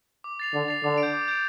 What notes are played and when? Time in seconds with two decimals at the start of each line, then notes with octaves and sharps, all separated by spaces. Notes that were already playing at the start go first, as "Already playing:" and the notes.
0.24 D6
0.40 A6 C7 F7
0.54 D3 D6
0.68 A6 C7 F7
0.84 D3 D6
0.98 D7
1.03 G6
1.13 D6
1.28 G6 D7